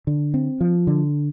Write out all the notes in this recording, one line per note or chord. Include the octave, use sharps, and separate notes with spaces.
D3
C4
F3
D3